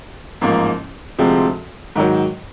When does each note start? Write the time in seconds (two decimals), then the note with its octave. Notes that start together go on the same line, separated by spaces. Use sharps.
0.41 A1 G#2 F3 A#3
1.19 D2 C3 F3 G#3 C4
1.96 G#2 D#3 F#3